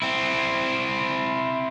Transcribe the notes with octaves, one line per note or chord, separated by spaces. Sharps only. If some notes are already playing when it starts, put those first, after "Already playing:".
C4 E4